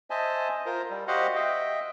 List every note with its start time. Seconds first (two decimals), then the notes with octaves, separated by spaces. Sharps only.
0.10 C5 D#5 E5 G#5 A5
0.66 F4 A#4 C5
0.90 G3
1.08 F#4 G4 C5 D#5 F5 F#5
1.35 D#5 E5 G5